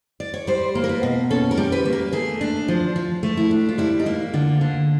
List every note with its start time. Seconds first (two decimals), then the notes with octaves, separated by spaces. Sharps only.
0.20 D5
0.34 C#5
0.47 G3 C5
0.75 A#3
0.84 A#4
0.89 B4
1.03 B2
1.31 C#4 A4
1.51 A#4
1.57 G3
1.72 B4
1.85 A#3
1.93 A#4
2.13 A3 G#4
2.41 D4
2.68 F3
2.96 F3
3.23 A3
3.37 E4
3.51 D4
3.69 F4
3.78 G3 E4
4.00 D#4
4.06 A#3 E4
4.34 D3 F4
4.61 D3